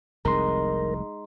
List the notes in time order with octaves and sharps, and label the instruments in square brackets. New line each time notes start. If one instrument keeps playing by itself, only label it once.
[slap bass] F1 C2 [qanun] G#3 D#4 [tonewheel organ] A#4 [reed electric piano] A#5 C6